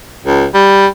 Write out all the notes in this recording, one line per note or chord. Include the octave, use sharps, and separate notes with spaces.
C#2
G3